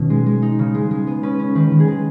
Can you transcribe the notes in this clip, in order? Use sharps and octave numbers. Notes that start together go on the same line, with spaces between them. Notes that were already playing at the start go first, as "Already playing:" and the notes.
Already playing: B2 D#3 C#4 B4
G#3
G#3
D#4
C#3
G#3
G#3
B3
C#4 B4
C#4
D#3 B4
D#3
G#4
G#3 B4